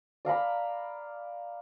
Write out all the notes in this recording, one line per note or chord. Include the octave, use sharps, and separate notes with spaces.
D5 F5 A#5 B5